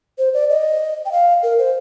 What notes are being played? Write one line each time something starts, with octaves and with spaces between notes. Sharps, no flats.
C5
D5
D#5
G5
F5
A#4
C5